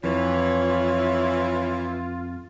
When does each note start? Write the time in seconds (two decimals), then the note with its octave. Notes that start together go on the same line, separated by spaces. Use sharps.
0.04 F2 E3 F4 C#5